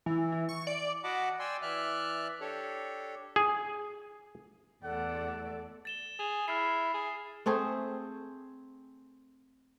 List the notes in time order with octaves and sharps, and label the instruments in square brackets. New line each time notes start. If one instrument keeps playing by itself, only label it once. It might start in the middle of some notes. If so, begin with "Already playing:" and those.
[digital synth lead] E3
E3
C#6
D5
[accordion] F#4 D#5 F#5 A5 B5 D6
D5 G5 G#5 C6 E6
E3 D5 E5 F6 F#6
D4 G4 A4 C#5
[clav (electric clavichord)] G#4
[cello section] E2 A3 D5 [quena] A4 [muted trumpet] F#5
[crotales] A6 E7 G7
[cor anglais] G#4 [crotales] F7
[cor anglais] E4 [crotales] F6 A6 C7
[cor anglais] G#4
[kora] A3 C4 G#4 C5